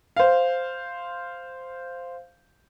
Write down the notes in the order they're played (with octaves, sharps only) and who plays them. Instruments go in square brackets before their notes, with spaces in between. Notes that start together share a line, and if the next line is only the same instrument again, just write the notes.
[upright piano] C5 F5